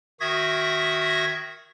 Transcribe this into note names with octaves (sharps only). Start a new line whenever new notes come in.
D#3 F#4 E5 D#6 G#6 A#6